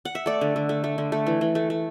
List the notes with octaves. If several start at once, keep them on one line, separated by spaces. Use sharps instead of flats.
F#5
E5
A3 D5
D3
D3
A3
A3
D3
A3
E3
E3
A3
A3